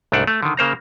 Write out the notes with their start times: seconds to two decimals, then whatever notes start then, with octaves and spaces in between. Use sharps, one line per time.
0.12 C2 G#2 A3 D4 F#5
0.27 A3
0.43 D3 D#3
0.57 C#3 A#3 C5 A#5